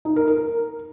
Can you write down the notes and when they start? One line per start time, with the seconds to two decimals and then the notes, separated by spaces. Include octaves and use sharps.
0.05 D#4
0.16 A#4
0.28 A#4